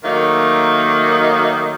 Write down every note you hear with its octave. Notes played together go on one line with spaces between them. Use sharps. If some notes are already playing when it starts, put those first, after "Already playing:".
D#3 F#3 A3 A#3 D#4